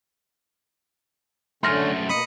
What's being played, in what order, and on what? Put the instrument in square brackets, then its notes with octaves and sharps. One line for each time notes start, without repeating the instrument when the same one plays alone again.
[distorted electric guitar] F#2 A3 [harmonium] D3 C#4 [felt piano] C6 F6 A#6
[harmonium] B2 A#3 D#5 [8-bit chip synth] B5 D#6 C#7